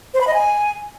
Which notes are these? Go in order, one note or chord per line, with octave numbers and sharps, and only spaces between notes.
C5
B5
D#5
G#5